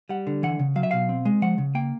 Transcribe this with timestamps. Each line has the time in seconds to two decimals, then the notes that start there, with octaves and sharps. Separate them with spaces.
0.09 G3 F#5
0.27 D3
0.43 E3 F#5
0.59 C#3
0.76 F#3 F5
0.83 E5
0.91 B2 F5
1.09 C4
1.25 G#3
1.42 F3 F#5
1.58 C#3
1.75 A#3 G5